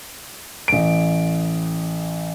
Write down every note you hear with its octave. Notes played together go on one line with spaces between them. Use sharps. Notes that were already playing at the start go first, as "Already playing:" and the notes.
A1 D7